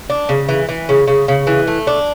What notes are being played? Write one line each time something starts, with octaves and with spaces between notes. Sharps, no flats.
D4
C#3
E3
E3
C#3
C#3
C#3
E3
A3
D4